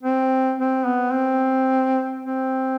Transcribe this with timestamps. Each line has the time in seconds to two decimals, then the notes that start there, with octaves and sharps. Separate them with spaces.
0.03 C4
0.59 C4
0.86 B3
1.13 C4
2.25 C4